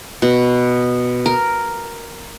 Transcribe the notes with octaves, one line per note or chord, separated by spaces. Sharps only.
B2
A#4